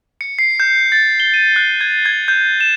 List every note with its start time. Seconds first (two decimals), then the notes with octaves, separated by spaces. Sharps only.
0.21 C#7
0.39 C7
0.60 G6
0.92 A6
1.20 G7
1.34 D#7
1.56 F#6
1.81 G#6
2.06 G#6
2.28 G6
2.61 E7